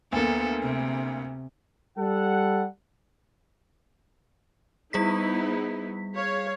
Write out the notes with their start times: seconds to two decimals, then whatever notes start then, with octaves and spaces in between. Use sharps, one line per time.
0.12 D2 A#3 B3 A4
0.62 C3
1.98 G3 A4 F#5
4.93 G3 B3 D#4 E4 G#4 B6
6.14 C#5 F5